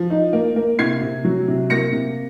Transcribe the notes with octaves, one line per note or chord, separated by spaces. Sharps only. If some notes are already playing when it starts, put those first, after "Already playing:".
Already playing: F3
D#4
A#3
A#3
C3 G#6 C7
C3
F#3
C3
A#3 A#6 C#7
C3